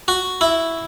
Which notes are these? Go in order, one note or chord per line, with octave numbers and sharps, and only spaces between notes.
F#4
E4